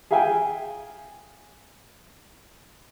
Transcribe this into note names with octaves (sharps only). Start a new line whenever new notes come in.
G#4 E5 F5 G5 G#5